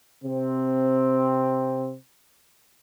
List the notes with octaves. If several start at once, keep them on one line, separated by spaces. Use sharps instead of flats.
C3 C4